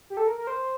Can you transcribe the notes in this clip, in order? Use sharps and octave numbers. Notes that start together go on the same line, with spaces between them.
G4
A4
A#4
A#4
C5